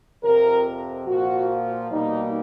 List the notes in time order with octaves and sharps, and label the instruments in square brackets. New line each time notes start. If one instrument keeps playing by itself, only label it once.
[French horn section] F2 C3 F3 A#4
A#2 F3 A#3 F#4
F4
B2 G3 A#3 D#4